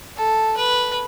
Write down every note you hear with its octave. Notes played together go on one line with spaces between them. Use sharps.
A4
B4